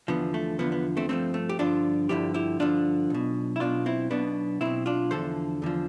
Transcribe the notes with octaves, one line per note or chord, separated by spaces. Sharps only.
E2 D3 F3 B3
A3
E2 D3 F3 B3
B3
A3 C4
G2 D3 F3 A3 C4
A3
G4
G2 D3 F3 D4 F4
G2 D3 F3 E4 G4
E4 G4
G2 D3 F3 D4 F4
B1 B2
E4
B1 B2 D4 F4
C4 E4
B1 B2 B3 D4
B1 B2 C4 E4
D4 F4
E2 D3 F3 A4 C5
E2 D3 F3